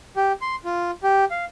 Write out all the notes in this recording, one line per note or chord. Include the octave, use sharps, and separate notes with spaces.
G4
C6
F4
G4
F5